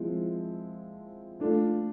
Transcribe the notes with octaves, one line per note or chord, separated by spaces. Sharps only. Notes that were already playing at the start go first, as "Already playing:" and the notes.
Already playing: F3 G#3 C4 E4
A3 D4 F4